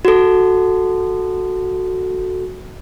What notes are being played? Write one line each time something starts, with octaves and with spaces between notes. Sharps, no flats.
F#4 A4